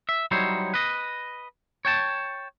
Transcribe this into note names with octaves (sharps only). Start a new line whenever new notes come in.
E5
F#3 G3 D#4 E4 C5 C#5
B4 D#5
C#5 G5 A5